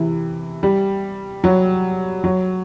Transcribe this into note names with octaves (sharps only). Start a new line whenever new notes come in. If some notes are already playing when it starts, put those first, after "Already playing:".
Already playing: C3 E3
G3
F#3
F#3